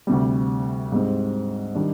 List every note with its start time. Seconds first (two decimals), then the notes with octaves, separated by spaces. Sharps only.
0.07 D2 C3 G3
0.92 G#2 G3 C4
1.75 D#3 G3 D4